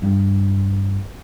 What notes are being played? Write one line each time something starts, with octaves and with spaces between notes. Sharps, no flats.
G2